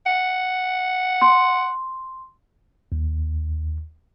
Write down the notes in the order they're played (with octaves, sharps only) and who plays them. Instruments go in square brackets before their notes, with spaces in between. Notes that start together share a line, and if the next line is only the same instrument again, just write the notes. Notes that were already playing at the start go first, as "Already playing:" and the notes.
[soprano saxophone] F#5
[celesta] C6
[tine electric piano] D#2